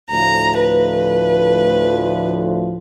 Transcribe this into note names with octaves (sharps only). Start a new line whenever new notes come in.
D2 A2 F3 A#5
B4